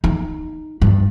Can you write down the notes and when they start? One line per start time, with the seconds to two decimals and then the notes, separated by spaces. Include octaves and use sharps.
0.04 D#4
0.82 G2